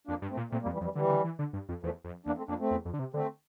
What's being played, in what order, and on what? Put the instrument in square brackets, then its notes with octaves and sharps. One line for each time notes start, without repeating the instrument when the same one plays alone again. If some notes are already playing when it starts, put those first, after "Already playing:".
[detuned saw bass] F2 [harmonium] A#3 D4
[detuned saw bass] G2
[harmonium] A3 C4
[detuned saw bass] A#2
[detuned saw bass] A#2 [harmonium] A3 C4
[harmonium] G3 A#3
[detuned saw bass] F2
[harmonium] E3 G3
[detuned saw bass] F2
[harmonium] E3 G3
[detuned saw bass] D3 [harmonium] E3 G3
[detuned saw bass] D3
E3
D3
G2
F2
[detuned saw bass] E2 [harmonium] F3 A3
[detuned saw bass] F2
[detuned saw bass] E2 [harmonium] A#3 D4
[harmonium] A3 C4
[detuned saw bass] F2 [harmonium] A#3 D4
[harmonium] A3 C4
[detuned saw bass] E2
F2
D3
C3
[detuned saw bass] D3 [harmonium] A3 C4